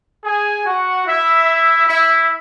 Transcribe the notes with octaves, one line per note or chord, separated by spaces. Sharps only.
G#4 G#5
F#4 F#5
E4 E5
E4 E5